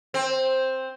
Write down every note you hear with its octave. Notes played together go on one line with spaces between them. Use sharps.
C4